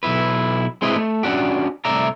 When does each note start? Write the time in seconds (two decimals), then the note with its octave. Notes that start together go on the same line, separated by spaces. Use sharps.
0.03 B1 B2 E4 B4
0.82 G#3 C4 E4 B4 D#5
0.96 A3
1.23 C#4 D4 F#4 G4
1.85 C2 A3 D5 E5 A#5